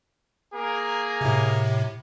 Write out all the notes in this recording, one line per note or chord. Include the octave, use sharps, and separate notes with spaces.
A#3 G#4 A#4
A2 C3